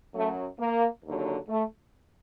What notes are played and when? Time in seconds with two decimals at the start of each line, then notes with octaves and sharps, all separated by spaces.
0.14 F#2 F#3 A3
0.59 A#3
1.04 D#2 D3 F#3
1.49 A3